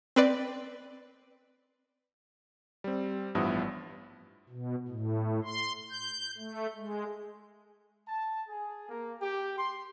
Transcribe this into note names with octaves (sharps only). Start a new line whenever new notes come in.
C4 B4 D5
G3 C4
A1 G2 F3 B3 E4 D#6
B2
A2
C6
G6
A3
G#3
A5
G#4
A#3
G4
C6